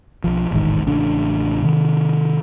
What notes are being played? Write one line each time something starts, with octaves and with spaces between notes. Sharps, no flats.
B1 F3
E1 A1 G#2 D#3
A1 C#3 D4
C3 D#3